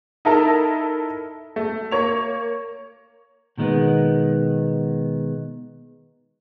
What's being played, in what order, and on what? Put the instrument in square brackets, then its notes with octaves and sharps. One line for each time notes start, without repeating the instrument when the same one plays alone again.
[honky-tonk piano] D#4 E4 A4 A#4
A3
A#3 C#5 F7
[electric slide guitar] B2 D#3 G#3 A#3 B3